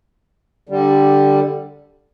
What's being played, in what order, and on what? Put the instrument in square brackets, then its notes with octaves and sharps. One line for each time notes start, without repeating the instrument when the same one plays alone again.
[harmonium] D3 G3